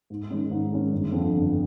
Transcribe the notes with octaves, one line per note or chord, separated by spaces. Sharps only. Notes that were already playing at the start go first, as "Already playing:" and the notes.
G#2
D#3 G#3 C#4
G#2
D#3 G#3 C#4
G1
F2 D3
G1